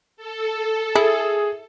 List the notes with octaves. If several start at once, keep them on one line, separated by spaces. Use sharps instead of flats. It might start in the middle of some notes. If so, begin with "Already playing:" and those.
A4
E4 G#4